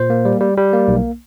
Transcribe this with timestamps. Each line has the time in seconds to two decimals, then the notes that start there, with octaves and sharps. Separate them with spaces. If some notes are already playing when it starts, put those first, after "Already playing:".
Already playing: A#2 C5
0.10 A#3
0.25 G3
0.40 G3
0.57 G3
0.73 A#3
0.88 B1